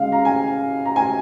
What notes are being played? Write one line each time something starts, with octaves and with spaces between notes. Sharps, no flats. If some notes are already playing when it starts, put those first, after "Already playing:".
Already playing: C#3 G#3 F5
A#5
G#5
A#5
G#5